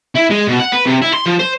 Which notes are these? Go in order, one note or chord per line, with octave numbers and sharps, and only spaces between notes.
E4
G#3
B2
F#5
B4
C3
E4
C6
F3
C5